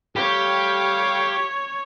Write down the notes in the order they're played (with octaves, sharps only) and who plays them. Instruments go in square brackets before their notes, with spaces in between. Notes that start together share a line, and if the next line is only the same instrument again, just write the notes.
[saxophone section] G3 A3 F5 [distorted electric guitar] G4 [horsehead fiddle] C#5